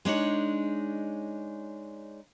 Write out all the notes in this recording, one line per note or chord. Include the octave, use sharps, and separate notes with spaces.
G#3 D4 D#4 C#5